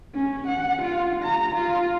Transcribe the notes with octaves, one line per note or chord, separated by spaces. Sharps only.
C#4
F#5
F4
A#5
F4